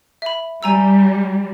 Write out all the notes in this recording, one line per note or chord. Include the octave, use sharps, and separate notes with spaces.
E5 B5
G3 G#5 A#5 E6